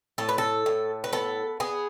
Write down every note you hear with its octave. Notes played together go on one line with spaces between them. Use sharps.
A2 A4
B4
A4
A2
B4
B3 A4
B3 G#4